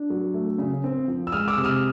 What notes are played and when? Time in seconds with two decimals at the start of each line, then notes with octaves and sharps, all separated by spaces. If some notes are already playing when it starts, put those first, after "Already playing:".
Already playing: D4
0.10 F#3
0.34 A3
0.58 C#3
0.84 C4
1.08 F3
1.27 E6
1.32 G#3 D#6 F6
1.48 D6 E6
1.56 C3
1.64 D#6 F6